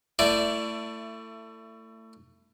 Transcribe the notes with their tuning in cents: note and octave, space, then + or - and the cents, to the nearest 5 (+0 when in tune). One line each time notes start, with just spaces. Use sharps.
A3 +25 E4 +20 D5 +0